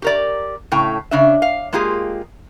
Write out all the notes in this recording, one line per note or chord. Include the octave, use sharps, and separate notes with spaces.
G4 A#4 D5
A2 C#3 G5
C#3 D4 E5
F5
G#3 A#3 F4 G4 G#4